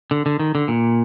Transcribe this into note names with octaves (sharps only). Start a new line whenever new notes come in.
D3
D3
D#3
D3
A#2